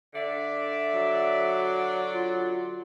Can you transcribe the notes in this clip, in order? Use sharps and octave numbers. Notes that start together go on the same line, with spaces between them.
D3 D5 E5
F#3
F4